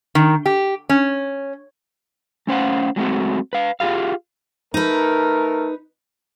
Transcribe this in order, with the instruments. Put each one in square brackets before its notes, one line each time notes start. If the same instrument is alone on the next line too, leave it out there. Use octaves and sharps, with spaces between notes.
[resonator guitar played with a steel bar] D#3
G4
C#4
[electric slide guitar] A3 C#4 C5 F5 F#5
F#3 G#3 A3 C4 F#4
B4 F5
F4 G4 G#4 F5
[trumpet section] A3 A#4 [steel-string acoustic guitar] D#4 B4